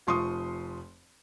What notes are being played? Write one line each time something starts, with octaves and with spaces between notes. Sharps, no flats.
F1 F3 C6 C#6 D#6